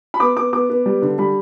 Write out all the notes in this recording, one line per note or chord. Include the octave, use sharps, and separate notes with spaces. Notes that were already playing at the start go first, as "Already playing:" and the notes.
B5
B3 D6
B3 D6
B3 D6
B3
G3
D3
G3 B5